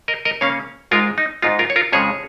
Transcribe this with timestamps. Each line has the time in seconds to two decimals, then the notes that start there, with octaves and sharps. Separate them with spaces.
0.08 A#4 D#5
0.25 A#4 D#5
0.41 C#3 A#3 C#4 C#5 F5
0.91 G#2 G#3 D#4 F4 A#4
1.18 D#4
1.42 G#2 G#3 D#4 F4
1.59 F4 A#4
1.70 C#5
1.76 F4 A#4
1.92 F2 C#3 F3 G#3 C#4 G#4 C#5